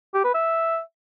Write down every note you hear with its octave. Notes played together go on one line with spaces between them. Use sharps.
G4
B4
E5